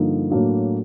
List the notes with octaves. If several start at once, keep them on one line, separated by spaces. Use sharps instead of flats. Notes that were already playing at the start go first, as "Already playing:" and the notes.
Already playing: G2 D3 F3 A#3 D#4
A2 F#3 A#3 D4 F#4